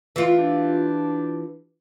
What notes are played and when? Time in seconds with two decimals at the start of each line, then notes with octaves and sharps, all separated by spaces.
0.16 E3 F4
0.37 D4 G4